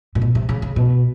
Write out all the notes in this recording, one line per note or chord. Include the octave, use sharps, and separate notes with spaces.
A#2
B2
C3
C#3
C#3
B2